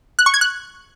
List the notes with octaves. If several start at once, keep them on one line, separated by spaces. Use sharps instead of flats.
F#6
C#6
G#6
F#6